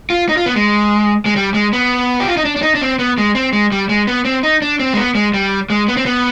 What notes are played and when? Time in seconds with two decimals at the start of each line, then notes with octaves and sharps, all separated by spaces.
0.10 F4
0.29 D#4
0.37 F4
0.46 B3
0.56 G#3
1.25 G#3
1.36 G3
1.54 G#3
1.73 B3
2.20 G4
2.28 F4
2.37 D#4
2.45 D4
2.56 D4
2.62 D#4
2.75 D4
2.82 C4
2.99 B3
3.18 G#3
3.35 C4
3.53 G#3
3.72 G3
3.89 G#3
4.07 B3
4.25 C4
4.43 D#4
4.62 D4
4.80 C4
4.93 G#3
4.97 B3
5.15 G#3
5.34 G3
5.70 G#3
5.88 B3
5.97 C4
6.06 B3